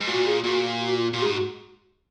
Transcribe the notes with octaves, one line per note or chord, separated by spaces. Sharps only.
G#2
A#2 F#4
G#4
A#2 F#4
F#4
F4
A#2 F#4
G#4
G#2
F#4